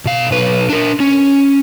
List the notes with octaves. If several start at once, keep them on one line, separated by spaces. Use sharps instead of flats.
B2 F5
B1 B4
D4 A#4
C#4